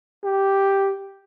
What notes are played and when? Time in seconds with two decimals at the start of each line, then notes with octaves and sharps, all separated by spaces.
0.24 G4